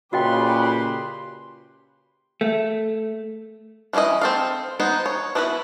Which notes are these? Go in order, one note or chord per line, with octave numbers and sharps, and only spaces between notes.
A#2 C#3 F#4 G4 B4 D#5 G5 C6
A3
E3 C#4 D4 E4 D#5
C4 A4 F5
B3 D#4 C5
C#5
B3 D4 E4 F#4 B4